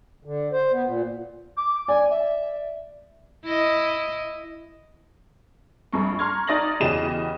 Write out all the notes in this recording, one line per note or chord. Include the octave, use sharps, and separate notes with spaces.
D3
C5
B3
A#2
D6
D5 G#5
E5
E4 D#5
A#1 G2 C#6
A#5 C6 C#6 F6 G#6
D#4 D5 D#6 A6 A#6 F#7
E2 C#3 F#4 G4 D#5 E7